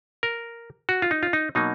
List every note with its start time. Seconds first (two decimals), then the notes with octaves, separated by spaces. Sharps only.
0.23 A#4
0.89 F#4
1.02 F4
1.11 D#4
1.23 F4
1.33 D#4
1.55 B2 F#3 A#3 D#4